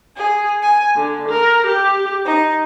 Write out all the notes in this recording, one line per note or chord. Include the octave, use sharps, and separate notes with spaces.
G#4
G#5
D3
A#4
G4
D#4